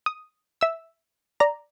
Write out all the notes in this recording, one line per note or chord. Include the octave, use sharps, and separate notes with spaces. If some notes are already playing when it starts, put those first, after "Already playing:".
D#6
E5 E6
D5 A#5